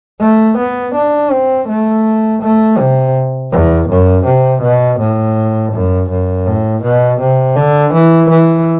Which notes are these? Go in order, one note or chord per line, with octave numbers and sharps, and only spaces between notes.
A3
B3
D4
C4
A3
A3
C3
E2
F#2
C3
B2
A2
F#2
F#2
A2
B2
C3
D3
E3
E3